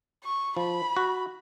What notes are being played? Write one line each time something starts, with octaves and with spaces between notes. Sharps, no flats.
C#6
F3 B5
F#4